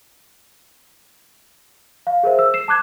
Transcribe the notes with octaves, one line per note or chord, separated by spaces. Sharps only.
F5
G#4 A#4 C5 E5
E6
C7 E7
A5 D6 F#6 G#6